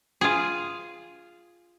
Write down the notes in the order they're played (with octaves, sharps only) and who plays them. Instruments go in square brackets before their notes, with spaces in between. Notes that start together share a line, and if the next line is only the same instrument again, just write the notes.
[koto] F4 G#4